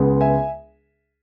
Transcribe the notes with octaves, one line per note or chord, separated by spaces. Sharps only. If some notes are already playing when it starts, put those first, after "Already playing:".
Already playing: C#2 C#3 G#3 B3
E5 G#5